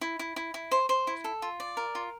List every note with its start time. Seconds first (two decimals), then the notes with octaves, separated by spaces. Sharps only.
0.01 E4
0.19 E4
0.36 E4
0.54 E4
0.71 C5
0.89 C5
1.07 E4
1.24 A4
1.42 F4
1.60 D5
1.77 A#4
1.95 F4